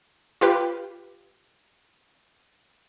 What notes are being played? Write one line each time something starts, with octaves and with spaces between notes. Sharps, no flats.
F4 G4 B4